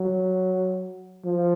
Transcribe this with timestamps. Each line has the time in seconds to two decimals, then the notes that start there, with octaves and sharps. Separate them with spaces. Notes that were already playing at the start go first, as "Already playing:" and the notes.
Already playing: F#3
1.24 F3